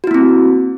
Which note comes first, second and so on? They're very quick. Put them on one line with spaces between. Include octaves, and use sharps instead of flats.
F#4 E4 A#3 C4